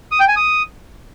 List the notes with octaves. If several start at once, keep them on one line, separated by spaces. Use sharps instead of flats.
D#6
G5
G#5
D#6